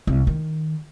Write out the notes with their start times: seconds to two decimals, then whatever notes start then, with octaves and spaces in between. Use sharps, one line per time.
0.07 C2
0.27 D#3